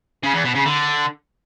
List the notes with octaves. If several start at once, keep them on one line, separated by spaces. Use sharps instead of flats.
C#3
E2
B2
C#3
D3